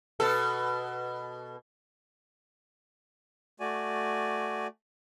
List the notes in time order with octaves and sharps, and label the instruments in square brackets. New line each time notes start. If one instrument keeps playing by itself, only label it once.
[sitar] B2 A4
[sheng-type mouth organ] A3 F#4 D5 G#5